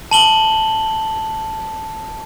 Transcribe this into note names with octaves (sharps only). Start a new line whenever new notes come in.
A5 F#7 G7